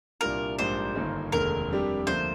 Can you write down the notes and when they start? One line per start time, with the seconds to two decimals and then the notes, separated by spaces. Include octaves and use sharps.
0.21 C2 A#2 G3 D4 F4 A#4
0.59 A#1 G#2 G3 A#3 D4 C5
0.95 G1 G2 D#3 A#3
1.32 F1 D#2 D3 G#3 A#4
1.70 F2 C3 G3 D4 G4
2.07 D2 D3 F3 A#3 C5